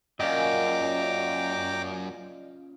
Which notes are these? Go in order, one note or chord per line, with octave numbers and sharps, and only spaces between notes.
F#2 A#2 C#3 D5 D#5 G5 A#5 D6